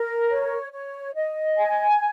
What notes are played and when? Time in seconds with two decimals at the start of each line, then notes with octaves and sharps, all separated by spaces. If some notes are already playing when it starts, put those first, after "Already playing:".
Already playing: A#4
0.29 C#5
0.71 C#5
1.14 D#5
1.57 G#5